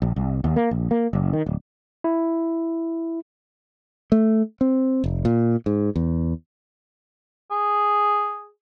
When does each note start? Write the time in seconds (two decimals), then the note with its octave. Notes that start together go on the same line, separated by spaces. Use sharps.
0.02 A#1
0.16 C2
0.44 D#2
0.56 A#3
0.71 A#1
0.91 A#3
1.13 F#1
1.33 D#3
1.46 D1
2.04 E4
4.12 A3
4.61 C4
5.04 F1
5.25 A#2
5.66 G#2
5.96 E2
7.51 G#4